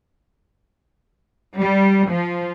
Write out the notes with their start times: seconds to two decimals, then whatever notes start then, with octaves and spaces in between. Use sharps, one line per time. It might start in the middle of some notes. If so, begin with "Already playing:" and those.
1.58 G3
2.08 F3